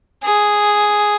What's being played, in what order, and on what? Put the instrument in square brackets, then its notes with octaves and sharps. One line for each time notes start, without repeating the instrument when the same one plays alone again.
[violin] G#4